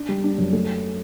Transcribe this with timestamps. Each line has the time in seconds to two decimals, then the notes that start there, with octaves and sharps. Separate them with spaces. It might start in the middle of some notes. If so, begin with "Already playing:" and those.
Already playing: D4
0.09 G3
0.24 D4
0.38 F#2
0.53 A3